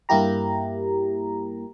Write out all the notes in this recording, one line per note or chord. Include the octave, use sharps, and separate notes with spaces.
G2 A#3 E4 G4 A#5